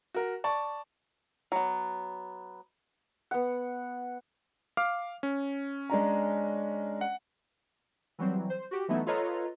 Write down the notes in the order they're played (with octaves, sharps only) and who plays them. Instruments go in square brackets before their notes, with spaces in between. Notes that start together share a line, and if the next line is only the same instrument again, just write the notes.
[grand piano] F#4 A#4
D5 A5 C#6
[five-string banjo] F#3 B3
[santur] B3 F#5
[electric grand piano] F5 D6 F6
C#4
[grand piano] G#3 D4 A#5
[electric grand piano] F#5
[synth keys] E3 F#3 G3 C4
C5
F#4 G4
E3 F#3 A3 B3 D#4 E4
F4 A4 B4 C#5 D#5 A#5